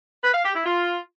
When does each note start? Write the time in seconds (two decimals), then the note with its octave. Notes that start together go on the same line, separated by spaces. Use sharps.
0.23 B4
0.33 F5
0.44 G4
0.54 E4
0.65 F4